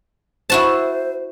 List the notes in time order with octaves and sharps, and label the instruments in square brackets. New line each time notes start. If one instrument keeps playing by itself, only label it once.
[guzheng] E4 F#4 A5 [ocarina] C5